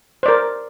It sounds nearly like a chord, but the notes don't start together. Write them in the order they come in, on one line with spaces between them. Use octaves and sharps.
C5 D5 A#4